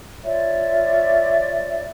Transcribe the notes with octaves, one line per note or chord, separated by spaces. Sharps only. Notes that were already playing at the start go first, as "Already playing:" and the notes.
F4 C#5 D5 E5